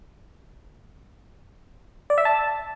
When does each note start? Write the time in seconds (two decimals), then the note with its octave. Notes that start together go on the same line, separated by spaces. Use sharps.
2.10 D5
2.18 E5
2.25 A5